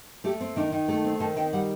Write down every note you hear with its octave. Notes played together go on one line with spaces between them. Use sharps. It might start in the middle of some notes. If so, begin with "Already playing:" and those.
A3 G4
C4
D#3 D4
D#3
A3 A4
C4
D#3 A5
D#3 G5
G3 F#5